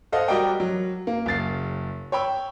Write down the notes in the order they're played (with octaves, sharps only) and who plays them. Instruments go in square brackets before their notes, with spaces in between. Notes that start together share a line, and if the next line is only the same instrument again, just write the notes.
[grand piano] A4 C5 D#5 F5 F#5
G3 F#4 A#4 D5 D#5 G5
F#3
A#3
F#1 C#3 A6 C7
C#5 G5 B5 E6